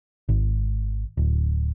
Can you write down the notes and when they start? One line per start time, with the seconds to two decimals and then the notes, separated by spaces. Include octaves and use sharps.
0.29 G#1
1.17 D1